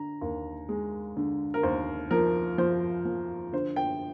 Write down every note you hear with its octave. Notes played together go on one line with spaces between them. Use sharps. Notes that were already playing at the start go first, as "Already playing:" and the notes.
Already playing: D3 A#5
D#2
G#3
D3
A#4
D#2 C5
F3 A#4
F3 C5
F3
D3 C5
G5